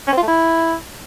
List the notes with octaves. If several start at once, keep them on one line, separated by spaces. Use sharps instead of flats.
C#4
C4
F4
A3
E4